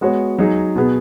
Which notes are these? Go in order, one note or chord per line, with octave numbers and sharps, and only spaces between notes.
G#3 B3 F#4 C#5
F#3 D#4 G#4
B2 B3 G#4